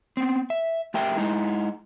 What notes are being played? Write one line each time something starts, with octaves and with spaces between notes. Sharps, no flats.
B3 C4
E5
A3 G4 A#4 E5 G5
G#3 D#4 E4